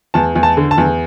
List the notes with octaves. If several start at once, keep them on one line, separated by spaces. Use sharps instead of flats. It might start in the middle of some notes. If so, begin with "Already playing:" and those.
E2 A5
E2
A5
D3
A5
E2